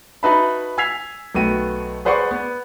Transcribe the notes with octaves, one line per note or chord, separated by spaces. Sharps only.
D#4 F#4 B4 E5 A5 B5
G#5 E6 G#6 B6 C7 F7
B1 A3 B3 F#4 G5 D#7
G#4 B4 C5 D5 F#5 C#6
B3